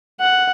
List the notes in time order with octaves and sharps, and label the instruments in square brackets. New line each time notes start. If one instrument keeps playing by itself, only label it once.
[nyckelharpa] F#5